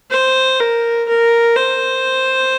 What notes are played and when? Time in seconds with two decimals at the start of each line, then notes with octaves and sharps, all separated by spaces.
0.11 C5
0.60 A#4
1.09 A#4
1.57 C5